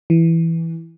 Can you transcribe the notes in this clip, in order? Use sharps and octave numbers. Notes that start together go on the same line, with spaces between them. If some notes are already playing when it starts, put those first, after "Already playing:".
E3